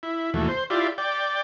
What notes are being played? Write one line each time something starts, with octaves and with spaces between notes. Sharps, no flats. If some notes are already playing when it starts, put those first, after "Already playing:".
E4
D#2 B2 E3 A3
C5
E4 F4 G4 D5
D5 G5